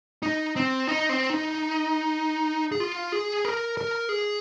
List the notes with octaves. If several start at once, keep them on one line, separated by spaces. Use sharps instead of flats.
D#4
C4
D#4
C4
D#4
G#4
F4
G#4
A#4
A#4
G#4